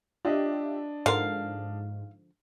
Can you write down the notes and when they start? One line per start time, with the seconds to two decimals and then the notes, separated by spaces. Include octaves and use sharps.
0.25 D4 F4 G4 D#5 E5
1.06 G#2 D3 F3 A#4 F5